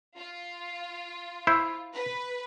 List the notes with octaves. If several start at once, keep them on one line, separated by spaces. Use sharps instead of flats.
F4
E4 C5
B4